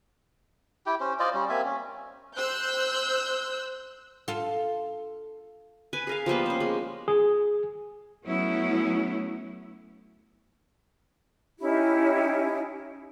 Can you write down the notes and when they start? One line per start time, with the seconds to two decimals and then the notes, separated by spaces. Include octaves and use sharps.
0.86 E4 G4 G5
1.00 C#4 C5
1.19 F4 C5 D5 D#5
1.34 G3 C#4
1.49 A#3 C4 E5 G#5
1.65 C#4
2.36 C5 E6 F#6 G6
4.28 F4 A4
5.93 B4 G#5
6.07 G#4 A#4 F5
6.26 F3 G3 A#3 B3
6.46 C#4 C5
6.60 G#3
7.08 G#4
8.26 F#3 A3 B3 C#4 E4
11.60 C#4 D#4 E4 G4